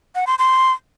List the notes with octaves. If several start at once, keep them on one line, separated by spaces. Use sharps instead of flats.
F#5
C6
C6